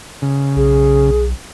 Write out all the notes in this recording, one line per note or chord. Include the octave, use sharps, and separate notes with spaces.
C#3
B1 G#4